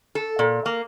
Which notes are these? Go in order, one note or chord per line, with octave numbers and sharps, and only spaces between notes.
A4
A#2
A#3